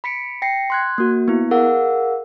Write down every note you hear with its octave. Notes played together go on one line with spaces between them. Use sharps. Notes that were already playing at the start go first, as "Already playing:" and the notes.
B5 B6 C#7 D7
G5 A#6 C7 C#7
C6 F#6 G#6
A#3 F#4
B3 E4
G#4 A#4 F5 F#5 E6